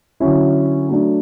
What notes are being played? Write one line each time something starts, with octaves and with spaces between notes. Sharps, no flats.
D3 F#3 C#4 E4
F#3 A3 D4